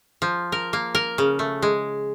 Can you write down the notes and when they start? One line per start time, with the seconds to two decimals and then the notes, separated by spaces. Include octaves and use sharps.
0.22 F3
0.52 A#4
0.73 A#3
0.95 A#4
1.18 C#3
1.39 A3
1.62 G#3